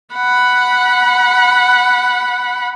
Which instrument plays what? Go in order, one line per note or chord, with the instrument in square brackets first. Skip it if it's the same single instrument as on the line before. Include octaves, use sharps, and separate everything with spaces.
[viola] F#5 B5